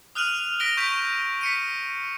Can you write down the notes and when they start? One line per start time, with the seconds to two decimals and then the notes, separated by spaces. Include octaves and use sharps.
0.15 D#6 F6 F#6 D#7 F7 F#7
0.60 F6 A#6 B6 D7 G7
0.77 C#6 G6 B6 D7
1.41 B6 C#7 D#7